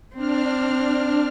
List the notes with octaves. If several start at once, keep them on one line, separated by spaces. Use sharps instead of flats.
C4 D4 F6